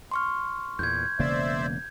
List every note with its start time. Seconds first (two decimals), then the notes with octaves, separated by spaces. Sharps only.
0.11 C6 C#6 F6
0.79 E2 A#2 G6 G#6
1.19 E1 C#3 A#3 C5 D5 E5